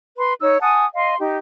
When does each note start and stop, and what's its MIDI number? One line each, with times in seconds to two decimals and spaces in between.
0.18 0.33 71
0.18 0.33 83
0.18 0.33 84
0.41 0.57 63
0.41 0.57 73
0.41 0.57 88
0.61 0.85 78
0.61 0.85 80
0.61 0.85 81
0.61 0.85 87
0.95 1.16 75
0.95 1.16 77
0.95 1.16 84
1.19 1.38 63
1.19 1.38 67